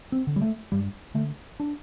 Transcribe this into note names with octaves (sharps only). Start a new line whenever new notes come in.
C4
D3
G3
A3
G2 G3
D3 A3
D4